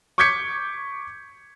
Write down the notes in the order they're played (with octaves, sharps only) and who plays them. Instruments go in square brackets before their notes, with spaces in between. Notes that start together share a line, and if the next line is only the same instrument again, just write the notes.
[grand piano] C#6 D6 G6 G#6 B6 C#7